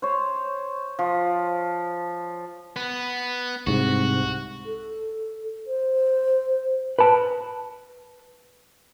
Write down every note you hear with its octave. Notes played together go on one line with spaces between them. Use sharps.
C5 C#5
F3
B3
C2 G#2 C3 F#4
A4
C5
B4 A5